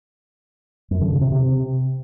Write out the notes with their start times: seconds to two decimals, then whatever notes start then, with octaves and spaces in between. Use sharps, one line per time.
0.91 F#2
1.01 D3
1.11 C#3
1.21 C3
1.32 C3